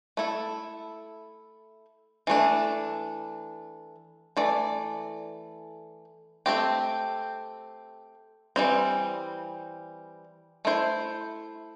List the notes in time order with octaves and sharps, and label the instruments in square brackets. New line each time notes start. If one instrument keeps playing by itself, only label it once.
[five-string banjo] A3 E4 A4
E3 A3 D4
E3 A3 D5
A3 C4 G4
E3 G3 C4
A3 E4 C5